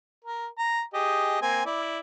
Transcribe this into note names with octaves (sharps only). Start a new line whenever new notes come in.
A#4
A#5
G4 G#4 D#5
A#3 C4 G#5
E4 D5